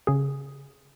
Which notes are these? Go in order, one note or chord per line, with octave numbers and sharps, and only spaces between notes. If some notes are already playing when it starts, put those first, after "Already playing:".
C#3 G#4